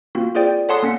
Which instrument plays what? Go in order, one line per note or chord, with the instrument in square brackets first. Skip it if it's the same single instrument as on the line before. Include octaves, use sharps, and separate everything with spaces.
[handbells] A#3 C4 F4 F#4
F4 G#4 C5 D5 G5
A4 C#5 F#5 A5 C6 D#6
A#3 C#4 F#5 B6 C#7